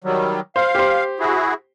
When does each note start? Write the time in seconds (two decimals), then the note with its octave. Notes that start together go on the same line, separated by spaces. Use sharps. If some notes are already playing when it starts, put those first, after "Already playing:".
0.04 D#3 F#3 G3
0.56 C5 F5
0.75 G4 C5
1.20 E4 F#4 G#4